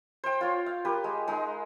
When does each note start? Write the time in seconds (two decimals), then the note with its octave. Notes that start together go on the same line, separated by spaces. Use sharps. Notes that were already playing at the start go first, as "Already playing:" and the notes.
0.24 C5 G5
0.41 F4 C#5
0.66 F5
0.85 G4 A#4 B4
1.04 G#3
1.28 G#3 D#4